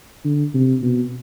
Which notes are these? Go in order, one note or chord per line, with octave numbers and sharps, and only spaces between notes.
D3
C3
B2